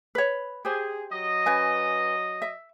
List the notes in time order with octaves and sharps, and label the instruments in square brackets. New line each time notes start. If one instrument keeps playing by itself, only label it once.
[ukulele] B4 C#5
[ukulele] G4 C5 [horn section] G#4
[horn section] F#3 D#5
[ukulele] C#4 B4 G#5
E5